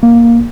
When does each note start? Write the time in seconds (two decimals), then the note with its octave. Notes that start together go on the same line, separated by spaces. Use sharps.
0.03 A#3